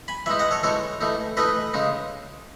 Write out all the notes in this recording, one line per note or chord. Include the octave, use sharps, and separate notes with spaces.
G#5 B5
E3 G#3 D#4 E5 G#5
D#5 F#5
A4 C#5
E3 G#3 D#4 A4 C#5
E3 A3 D#4
E3 A3 D#4 B4 D#5
C#3 G#3 D#4